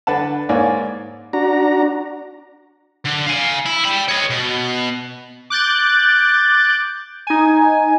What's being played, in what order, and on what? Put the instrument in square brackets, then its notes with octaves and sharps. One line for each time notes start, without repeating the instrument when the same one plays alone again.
[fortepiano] D3 B4 F#5 A5
G#2 A#3 C#5 D5 G#5
[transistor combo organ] D4 F#4 A#5
[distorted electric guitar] D3
F5 G#5
E4
G5 B5
C#5 D#5
B2
[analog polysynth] D6 F#6 G6 A6
D#4 G#5